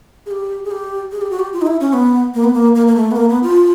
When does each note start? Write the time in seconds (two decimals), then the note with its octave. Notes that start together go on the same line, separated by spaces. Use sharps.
0.26 G#4
0.31 G4
0.65 G#4
0.71 G4
1.12 G#4
1.21 G4
1.31 F#4
1.40 G4
1.53 F4
1.62 D#4
1.67 E4
1.81 C#4
1.93 B3
2.34 A#3
2.44 B3
2.54 A#3
2.75 A#3
2.87 A#3
2.96 A3
3.11 B3
3.16 A#3
3.29 B3
3.43 F4